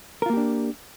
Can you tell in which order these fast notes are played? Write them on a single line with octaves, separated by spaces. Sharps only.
A#4 F4 A#3 G4 D4